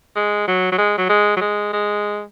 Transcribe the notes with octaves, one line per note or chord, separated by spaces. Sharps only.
G#3
F#3
F#3
G#3
F#3
G#3
F#3
G#3
G#3